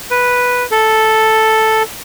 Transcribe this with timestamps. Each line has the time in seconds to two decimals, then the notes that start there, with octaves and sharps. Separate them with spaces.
0.11 B4
0.71 A4